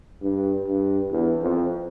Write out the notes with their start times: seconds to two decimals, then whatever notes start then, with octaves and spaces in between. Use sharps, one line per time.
0.22 G2
0.67 G2
1.11 E2
1.41 F2